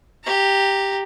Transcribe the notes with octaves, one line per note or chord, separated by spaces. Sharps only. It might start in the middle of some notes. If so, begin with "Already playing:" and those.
G4 A#5